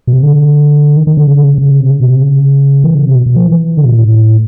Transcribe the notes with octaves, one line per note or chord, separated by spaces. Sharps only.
B2
C3
D3
D#3
D#3
D3
C#3
D3
C#3
C#3
C3
C#3
B2
C3
C#3
E3
C#3
C3
B2
B2
F3
E3
D3
B2
A#2
A2